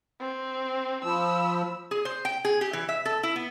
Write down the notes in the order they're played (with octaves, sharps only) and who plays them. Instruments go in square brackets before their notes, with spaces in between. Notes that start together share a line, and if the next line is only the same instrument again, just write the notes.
[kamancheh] C4
[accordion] F3 [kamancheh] B5 E6
[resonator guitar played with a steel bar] G#4
C5
G5
G#4
G4
E3
E5
A4
E4
B3